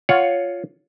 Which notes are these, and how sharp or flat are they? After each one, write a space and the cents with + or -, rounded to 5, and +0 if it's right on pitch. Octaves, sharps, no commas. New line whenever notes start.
F4 +5 C#5 +10 F#5 +0